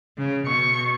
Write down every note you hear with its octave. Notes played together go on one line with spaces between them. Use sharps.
C#3
B2 C#6